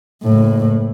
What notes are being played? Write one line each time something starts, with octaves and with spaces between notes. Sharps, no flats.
F#1 A2